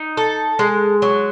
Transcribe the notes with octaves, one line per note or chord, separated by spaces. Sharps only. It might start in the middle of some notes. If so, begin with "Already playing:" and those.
Already playing: D#4
A4
G#3
F#3